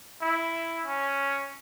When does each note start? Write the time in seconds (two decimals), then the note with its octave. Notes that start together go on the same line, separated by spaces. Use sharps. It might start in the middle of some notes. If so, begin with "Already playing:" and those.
0.21 E4
0.86 C#4